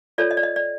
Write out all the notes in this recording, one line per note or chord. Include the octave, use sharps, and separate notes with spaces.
F4 A4 C#5 D5
D#5
D5
D#5
D5